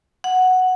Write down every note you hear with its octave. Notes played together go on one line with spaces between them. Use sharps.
F#5